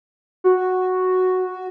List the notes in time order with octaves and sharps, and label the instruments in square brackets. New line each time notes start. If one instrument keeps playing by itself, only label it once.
[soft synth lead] F#4